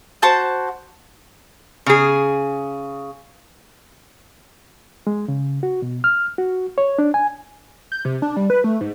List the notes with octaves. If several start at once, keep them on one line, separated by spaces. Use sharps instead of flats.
F#4 C5 A5 G6
C#3 G#4
G#3
C#3
F#4
B2
F6
F#4
C#5
D4
G#5
G6
C3
D4
G3
B4
A3
G#2